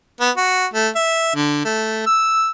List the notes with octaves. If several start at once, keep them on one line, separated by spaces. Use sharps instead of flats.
B3
F#4
A3
E5
D3
A3
E6